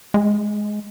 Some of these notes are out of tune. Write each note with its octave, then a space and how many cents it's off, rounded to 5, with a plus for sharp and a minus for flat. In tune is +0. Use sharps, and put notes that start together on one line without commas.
G#3 +10